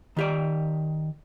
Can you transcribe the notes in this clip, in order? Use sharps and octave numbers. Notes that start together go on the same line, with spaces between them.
D#3 G4 D5